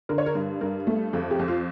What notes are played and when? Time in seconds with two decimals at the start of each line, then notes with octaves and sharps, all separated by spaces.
0.09 D3 A#4
0.18 C#5
0.26 A#4
0.35 G2
0.61 G2 A#4
0.87 A3
1.13 F2 A4
1.31 G4
1.39 F2
1.48 F4